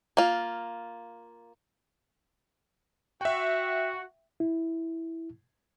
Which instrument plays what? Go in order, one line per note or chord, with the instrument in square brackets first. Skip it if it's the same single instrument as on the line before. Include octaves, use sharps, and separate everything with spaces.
[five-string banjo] A#3 F4
[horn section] F#4 [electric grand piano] E5 G5
[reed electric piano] E4